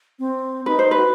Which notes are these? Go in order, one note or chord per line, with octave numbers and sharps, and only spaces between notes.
C4
D#4 B4
C5
B4
F#4